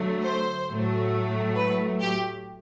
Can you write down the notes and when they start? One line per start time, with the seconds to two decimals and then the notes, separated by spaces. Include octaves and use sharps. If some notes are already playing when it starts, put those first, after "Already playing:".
Already playing: D3 F#3 A3
0.24 C5
0.68 A2 F#3 A3
1.56 B4
2.01 G4